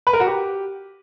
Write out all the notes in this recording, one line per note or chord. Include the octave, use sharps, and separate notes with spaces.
B4
A#4
F#4
G4